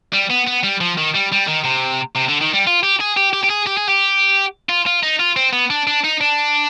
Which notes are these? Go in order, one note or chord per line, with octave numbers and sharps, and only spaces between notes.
G3
B3
B3
G3
F3
D#3
G3
G3
D#3
C3
C3
D3
D#3
G3
F4
G4
G#4
G4
G4
G4
G#4
G4
G#4
G4
F4
F4
D#4
F4
C4
B3
D4
D4
D#4
D4